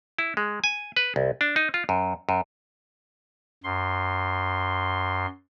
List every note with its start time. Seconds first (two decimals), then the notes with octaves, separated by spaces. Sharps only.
0.19 E4
0.37 G#3
0.64 G#5
0.96 B4
1.16 C2
1.41 D4
1.56 D#4
1.74 F4
1.89 F#2
2.29 F#2
3.64 F#2 C6